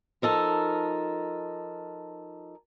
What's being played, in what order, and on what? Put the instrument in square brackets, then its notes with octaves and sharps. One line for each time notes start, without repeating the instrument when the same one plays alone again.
[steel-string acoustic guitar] F3 D#4 A4 A#4